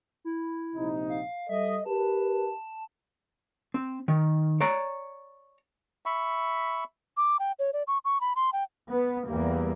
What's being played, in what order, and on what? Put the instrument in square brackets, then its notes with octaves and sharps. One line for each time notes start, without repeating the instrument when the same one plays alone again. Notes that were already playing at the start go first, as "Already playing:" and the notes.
[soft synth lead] E4
[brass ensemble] A#1 C3 D#4
[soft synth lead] F5
[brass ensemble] G3 A4 D#5 [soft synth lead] E5
[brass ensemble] G4 A#4 B4 [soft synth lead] A5
[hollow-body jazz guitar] C4
D#3
C#5 D5 A#5
[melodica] E5 B5 C#6
[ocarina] D6
G5
C#5
D5
C#6
C#6
B5
C6
G5
[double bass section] B3
E2 G3 A#3